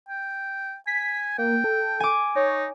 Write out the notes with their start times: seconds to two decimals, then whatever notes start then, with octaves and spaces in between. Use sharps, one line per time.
0.09 G5
0.87 G#5 B6
1.38 A#3 G5
1.64 A4
2.00 G#5 D6
2.36 D#4 C#5